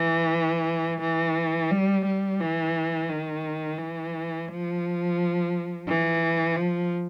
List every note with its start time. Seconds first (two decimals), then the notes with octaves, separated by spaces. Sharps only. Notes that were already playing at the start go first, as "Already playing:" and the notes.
Already playing: E3
1.01 E3
1.71 G3
2.05 G3
2.41 E3
3.09 D#3
3.78 E3
4.48 F3
5.87 E3
6.56 F3